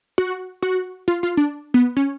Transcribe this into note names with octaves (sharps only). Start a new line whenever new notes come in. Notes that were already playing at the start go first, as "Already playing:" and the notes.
F#4
F#4
F4
F4
D4
B3
C#4